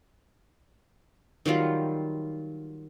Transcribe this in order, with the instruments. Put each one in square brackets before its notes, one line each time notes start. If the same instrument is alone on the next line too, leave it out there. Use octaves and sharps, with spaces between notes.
[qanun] D#3 F#3 G3 F4